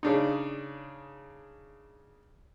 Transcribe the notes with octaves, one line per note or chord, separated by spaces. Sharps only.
C#3 D4 D#4